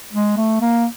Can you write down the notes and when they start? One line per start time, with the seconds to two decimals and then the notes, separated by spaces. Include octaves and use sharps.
0.13 G#3
0.37 A3
0.61 A#3